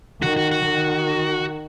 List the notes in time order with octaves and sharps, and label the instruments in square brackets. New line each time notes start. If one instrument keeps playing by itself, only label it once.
[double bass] D#3 [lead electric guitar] F#4
[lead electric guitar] F#4
F#4
[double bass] D#3